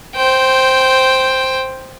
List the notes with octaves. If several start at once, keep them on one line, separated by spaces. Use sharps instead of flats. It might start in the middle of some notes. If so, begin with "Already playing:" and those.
C5 G5